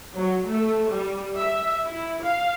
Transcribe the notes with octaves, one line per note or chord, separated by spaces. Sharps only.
F#3
A3
G3
E5
E4
F5